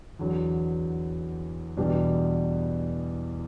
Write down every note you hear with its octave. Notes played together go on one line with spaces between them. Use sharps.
E2 D3 F#3
E2 B2 G3 D4